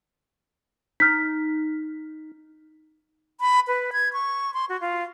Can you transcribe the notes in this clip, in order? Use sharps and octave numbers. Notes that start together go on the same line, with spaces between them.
D#4 F6 B6
B5
B4
G#6
C#6
C6
F#4
F4